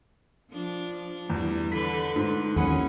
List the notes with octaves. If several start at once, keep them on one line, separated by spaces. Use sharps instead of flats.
F3 D4
E2 G3
D3 B4 B6
G#2
D#2 E3 F#3 A#3 C#4 G#4 F#5 B5